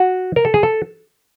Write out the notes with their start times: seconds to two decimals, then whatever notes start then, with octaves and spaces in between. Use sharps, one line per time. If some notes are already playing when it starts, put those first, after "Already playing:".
Already playing: F#4
0.36 A#4
0.45 A4
0.54 G#4
0.63 A4